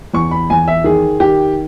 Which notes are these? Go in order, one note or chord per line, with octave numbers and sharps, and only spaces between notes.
E2 C#6
B5
E2 G#5
E5
D#3 G#4
D#3 G4